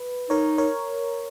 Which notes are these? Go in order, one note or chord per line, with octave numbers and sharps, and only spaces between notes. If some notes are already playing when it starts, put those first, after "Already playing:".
Already playing: B4
D#4 A#4 C#5
A#4 C#5